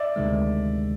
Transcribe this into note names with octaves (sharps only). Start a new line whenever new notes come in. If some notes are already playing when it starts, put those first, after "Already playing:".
Already playing: D5 E5
D2 C3 D#3 G#3